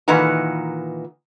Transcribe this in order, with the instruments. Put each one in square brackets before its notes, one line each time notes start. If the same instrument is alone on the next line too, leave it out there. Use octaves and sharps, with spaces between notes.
[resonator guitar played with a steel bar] A#2 D#3 E3 B4 F#5 A#5